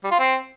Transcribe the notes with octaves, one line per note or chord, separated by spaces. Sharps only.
G3
F4
C4